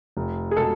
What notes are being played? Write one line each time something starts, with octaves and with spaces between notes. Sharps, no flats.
F1
G#4
B2 G#3 A4